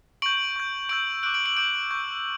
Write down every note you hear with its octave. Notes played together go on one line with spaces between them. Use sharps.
C#6 G6 D7 F#7
C#6 G6
C#6 E6 G6 D7 F#7
D6 F#6 D7 F#7
D7 F#7
D7 F#7
D6 G6 D7 F#7
C#6 E6 G6